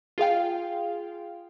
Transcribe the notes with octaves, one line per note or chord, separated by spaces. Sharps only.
F4 G#4 F5 G5